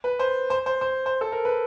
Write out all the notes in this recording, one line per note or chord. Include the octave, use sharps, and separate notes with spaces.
B4
C5
C5
C5
C5
C5
A4
A#4
B4